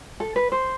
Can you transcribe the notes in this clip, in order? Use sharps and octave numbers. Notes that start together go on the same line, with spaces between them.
A4
B4
C5